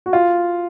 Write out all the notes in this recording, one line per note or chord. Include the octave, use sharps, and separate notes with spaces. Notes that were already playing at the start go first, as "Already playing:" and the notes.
F#4
F4